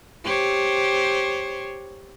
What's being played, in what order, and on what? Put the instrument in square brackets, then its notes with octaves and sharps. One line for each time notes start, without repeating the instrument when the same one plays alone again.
[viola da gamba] G4 C5 C#5